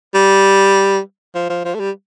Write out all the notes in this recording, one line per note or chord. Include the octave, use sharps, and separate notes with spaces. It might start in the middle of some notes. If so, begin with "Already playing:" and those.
G3
F3
F3
F3
A3
G3